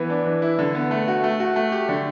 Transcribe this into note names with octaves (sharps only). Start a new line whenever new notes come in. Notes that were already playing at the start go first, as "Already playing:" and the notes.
Already playing: E3 B3
D4
E3
E4
D3
B3
A3
F#4
A3
F#4
A3
G4
D3